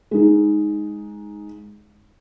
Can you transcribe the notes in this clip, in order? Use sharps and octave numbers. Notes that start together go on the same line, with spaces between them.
G#3 D#4